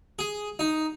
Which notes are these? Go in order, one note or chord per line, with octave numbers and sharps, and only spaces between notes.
G#4
D#4